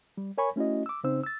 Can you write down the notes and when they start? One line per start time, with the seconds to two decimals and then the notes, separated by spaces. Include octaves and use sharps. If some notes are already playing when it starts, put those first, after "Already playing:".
0.17 G3
0.38 A#4 C#5 G#5 B5 C#6
0.56 A3 C#4 E4 F#4 D#5
0.86 D6 E6
1.04 C#3 C4 D#4 C5 E6
1.23 E6 A6